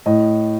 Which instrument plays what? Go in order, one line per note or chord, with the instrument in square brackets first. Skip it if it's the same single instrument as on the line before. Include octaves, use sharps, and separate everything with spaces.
[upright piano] A2 D#5